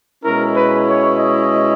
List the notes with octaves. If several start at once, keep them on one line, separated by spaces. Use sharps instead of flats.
B2 G#3 C#4 E4 A#4
B4
C#5
D#5